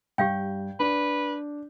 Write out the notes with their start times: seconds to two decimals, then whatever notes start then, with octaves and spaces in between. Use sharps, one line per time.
0.18 G2 G4 F5 G5 G6
0.80 D4 B4